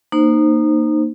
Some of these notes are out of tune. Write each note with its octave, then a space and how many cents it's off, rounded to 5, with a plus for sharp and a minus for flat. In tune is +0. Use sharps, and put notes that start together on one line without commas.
A#3 +0 D#4 -25 C5 +0